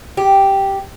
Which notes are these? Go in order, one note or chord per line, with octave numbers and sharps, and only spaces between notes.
G4